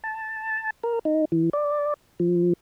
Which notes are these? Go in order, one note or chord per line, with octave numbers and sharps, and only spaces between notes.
A5
A#4
D#4
E3
D5
F3